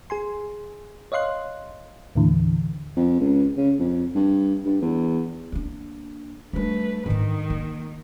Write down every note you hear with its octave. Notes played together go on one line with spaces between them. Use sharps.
G#4 G#5 C6
C#5 D#5 F5 C6 F#6
D#2 A2 D3 E3
F2
C#2
C#3
F2
G2
G2
E2
A#3 D4
G3 A3 D4 B4
G#2 D3 D#3
A#3